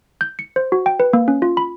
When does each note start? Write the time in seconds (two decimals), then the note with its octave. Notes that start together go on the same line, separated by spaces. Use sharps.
0.21 G6
0.39 C#7
0.56 C5
0.72 F#4
0.86 G5
1.00 B4
1.13 A#3
1.28 C#4
1.42 F4
1.57 B5